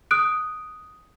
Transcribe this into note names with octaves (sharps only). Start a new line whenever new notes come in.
D#6 F#6 D7